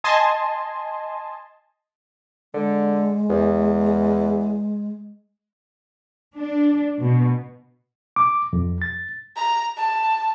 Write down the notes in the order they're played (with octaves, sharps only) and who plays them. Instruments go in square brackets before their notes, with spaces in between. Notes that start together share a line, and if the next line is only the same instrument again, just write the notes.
[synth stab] D#5 G#5 A5 C6
[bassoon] D3 [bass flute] G#3
[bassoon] E2
[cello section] D4
B2
[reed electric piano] D6
F2
A6
[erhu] A#5
A5